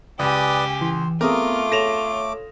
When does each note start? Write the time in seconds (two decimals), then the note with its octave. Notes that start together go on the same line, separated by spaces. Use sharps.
0.19 C#2 G4 B4 D5 G#5 D#6
0.81 E3 C6
1.21 A3 B3 C4 F4 G#4 A#4 D6 D#6
1.72 A4 C#5 A#6 E7 F7